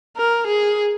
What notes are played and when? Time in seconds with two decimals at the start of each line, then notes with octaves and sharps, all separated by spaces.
0.17 A#4
0.47 G#4